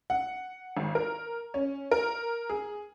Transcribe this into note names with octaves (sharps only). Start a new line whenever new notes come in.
F#5
G#1
A#4
C#4
A#4
G#4